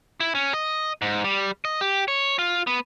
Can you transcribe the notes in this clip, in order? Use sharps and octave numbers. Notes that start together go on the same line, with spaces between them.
E4
C#4
D#5
G#2
G3
D#5
G4
C#5
F4
B3